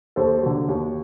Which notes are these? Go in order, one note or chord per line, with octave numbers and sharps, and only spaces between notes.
D#2 A4 C5
D3 F#3
D#2